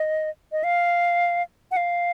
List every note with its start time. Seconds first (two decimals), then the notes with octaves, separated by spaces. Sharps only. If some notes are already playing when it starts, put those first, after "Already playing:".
Already playing: D#5
0.52 D#5
0.64 F5
1.71 F#5
1.77 F5